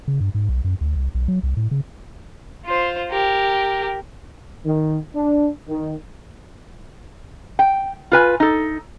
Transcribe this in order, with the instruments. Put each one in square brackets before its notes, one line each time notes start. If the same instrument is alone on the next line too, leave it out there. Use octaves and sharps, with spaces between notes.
[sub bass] C#3
G2
G#2
B1
F#2
D2
C2
B1
F#3
C2
A2
C#3
[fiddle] F4 C5
G4 A#4
[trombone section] D#3
D4
D#3
[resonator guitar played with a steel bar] G5
F4 B4 G#5
D#4 A4